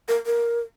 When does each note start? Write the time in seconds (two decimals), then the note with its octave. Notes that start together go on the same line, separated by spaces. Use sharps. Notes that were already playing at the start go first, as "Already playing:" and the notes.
0.08 A#4
0.26 A#4